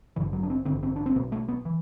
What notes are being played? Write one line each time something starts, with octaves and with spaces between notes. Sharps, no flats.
A1 G2 D3 E3
F#3
D4
C4
A1 G2 D3 C4
C4
D4
C4
B1 B2 B3
A3
B3
E3